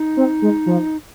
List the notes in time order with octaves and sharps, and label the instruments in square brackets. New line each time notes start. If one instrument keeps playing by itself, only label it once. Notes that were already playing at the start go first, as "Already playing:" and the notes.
Already playing: [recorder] D#4
[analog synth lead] C4
G#3
F3